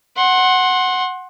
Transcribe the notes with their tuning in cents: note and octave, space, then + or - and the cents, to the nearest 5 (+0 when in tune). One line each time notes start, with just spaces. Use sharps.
F#5 +0 C6 +25